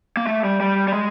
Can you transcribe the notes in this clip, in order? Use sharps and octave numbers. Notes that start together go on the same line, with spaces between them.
A#3
A3
G3
G3
G3
G#3